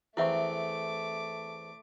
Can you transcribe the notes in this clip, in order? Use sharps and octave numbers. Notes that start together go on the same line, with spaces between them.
E2 A3 C4 E4 E5 C#6 D6